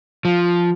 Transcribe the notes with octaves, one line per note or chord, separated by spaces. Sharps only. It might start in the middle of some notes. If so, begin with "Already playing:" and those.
F3